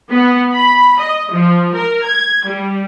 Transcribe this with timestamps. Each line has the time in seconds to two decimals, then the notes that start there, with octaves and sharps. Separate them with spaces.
0.10 B3
0.53 B5
0.99 D#5
1.31 F3
1.74 A#4
2.04 G#6
2.45 G3